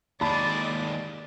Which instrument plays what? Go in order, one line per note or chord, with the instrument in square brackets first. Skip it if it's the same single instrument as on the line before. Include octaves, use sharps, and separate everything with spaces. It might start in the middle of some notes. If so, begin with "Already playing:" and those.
[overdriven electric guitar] D#2 G#3 [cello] D5 [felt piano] A5 B5